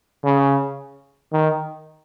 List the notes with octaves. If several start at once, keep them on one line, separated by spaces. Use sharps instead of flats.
C#3
D#3